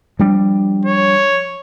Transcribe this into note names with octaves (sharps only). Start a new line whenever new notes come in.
F3 G3 D4
C#5